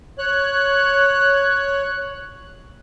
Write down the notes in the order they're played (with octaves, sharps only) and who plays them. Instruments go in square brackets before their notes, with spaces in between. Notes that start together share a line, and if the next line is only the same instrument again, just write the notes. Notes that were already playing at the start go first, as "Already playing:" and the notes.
[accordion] C#5 F#6